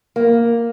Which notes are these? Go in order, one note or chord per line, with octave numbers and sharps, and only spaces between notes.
A#3